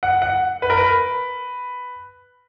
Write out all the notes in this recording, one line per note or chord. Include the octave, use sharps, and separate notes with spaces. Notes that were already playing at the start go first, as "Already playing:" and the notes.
F#5
F#5
B4
A#4
B4